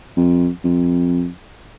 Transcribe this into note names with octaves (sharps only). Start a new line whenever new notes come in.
F2
F2